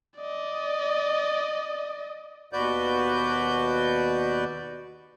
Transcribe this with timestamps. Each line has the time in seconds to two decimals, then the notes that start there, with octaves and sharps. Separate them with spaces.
0.17 D5 D#5
2.53 D#2 B2 F#4 B4 D5 G6